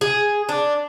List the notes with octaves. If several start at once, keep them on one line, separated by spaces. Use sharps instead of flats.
G#4
D4